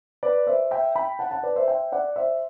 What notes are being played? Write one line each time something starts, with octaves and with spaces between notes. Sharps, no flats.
B4 D5
C5 E5
E5 G5
G5 B5
F#5 A5
F#5 A5
B4 D5
C5 E5
E5 G5
D5 F#5
C5 E5